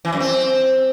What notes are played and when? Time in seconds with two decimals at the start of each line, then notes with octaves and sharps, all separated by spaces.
0.05 E3
0.13 F#2
0.20 C4